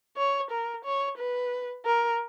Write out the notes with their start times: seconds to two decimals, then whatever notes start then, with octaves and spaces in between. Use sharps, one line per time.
0.17 C#5
0.51 A#4
0.85 C#5
1.18 B4
1.85 A#4